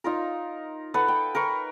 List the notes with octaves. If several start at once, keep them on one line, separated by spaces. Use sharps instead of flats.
D#4 F4 A#4
A4 B4 F#5
G5
A#4 B4 C#6